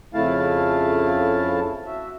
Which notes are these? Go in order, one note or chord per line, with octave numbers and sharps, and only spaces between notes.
F2 C#3 A3 E4 F5 A5
F#4 E5